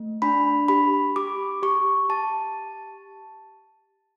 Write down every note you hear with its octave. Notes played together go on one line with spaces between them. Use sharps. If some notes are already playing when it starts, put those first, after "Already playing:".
Already playing: A3
D4 B5
G4 B5
G4 D6
G4 C#6
G4 A5